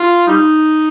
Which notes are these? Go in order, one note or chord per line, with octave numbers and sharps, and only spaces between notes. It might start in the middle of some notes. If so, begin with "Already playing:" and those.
Already playing: F4
G3 D#4